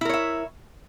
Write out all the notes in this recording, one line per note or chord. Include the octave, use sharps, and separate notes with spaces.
E4 A#4 C#5 E5